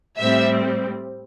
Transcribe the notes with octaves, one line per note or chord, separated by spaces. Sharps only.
A2 G3 C4 E5